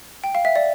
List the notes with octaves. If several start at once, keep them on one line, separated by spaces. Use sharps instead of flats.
G5
F5
E5
D5